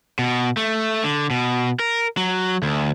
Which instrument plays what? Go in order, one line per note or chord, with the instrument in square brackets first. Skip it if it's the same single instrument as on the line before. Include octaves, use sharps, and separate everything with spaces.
[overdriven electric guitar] B2
A3
D3
B2
A#4
F#3
D2